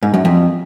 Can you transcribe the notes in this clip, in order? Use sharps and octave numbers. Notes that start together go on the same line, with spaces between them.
G#2
F#2
F2